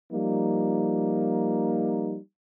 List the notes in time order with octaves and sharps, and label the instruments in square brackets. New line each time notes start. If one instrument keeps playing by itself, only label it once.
[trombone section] F3 G3 A#3 D#4